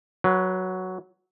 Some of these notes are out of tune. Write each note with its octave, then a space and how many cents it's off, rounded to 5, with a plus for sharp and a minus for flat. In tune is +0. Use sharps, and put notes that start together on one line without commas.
F#3 +0 B4 -25